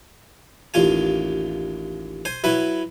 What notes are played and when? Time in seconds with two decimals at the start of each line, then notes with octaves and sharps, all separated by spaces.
0.74 A1 D#2 F4 G#5
2.25 C5 G#5
2.44 F#3 E4 B4 G#5